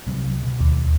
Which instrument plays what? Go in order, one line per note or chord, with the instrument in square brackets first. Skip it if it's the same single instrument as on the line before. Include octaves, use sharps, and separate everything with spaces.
[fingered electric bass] C2 C3 F#3
B2
[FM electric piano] D#2